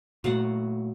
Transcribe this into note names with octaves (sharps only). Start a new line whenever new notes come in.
A#2 F#3 A3 F5 F#5